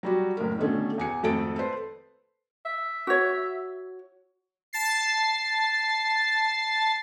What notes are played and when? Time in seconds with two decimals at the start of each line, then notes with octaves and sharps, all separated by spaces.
0.03 F#3 G3 F#4
0.37 F#1 A2 A#4
0.58 B2 D3 D#3 A3 C#4
0.98 E2 G#5 C#7
1.23 G#1 F2 A3 A4 A6 D7
1.56 A4 B4 C5
2.65 E5
3.07 F#4 C#5
4.73 A5 A6 C7